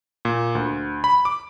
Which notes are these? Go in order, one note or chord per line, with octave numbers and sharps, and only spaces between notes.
A#2
D2
B5
D6